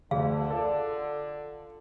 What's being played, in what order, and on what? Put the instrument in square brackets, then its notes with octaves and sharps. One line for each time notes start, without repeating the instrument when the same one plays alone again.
[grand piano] D2 [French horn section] D3 [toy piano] G#4 F5
[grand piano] F4 A4 D5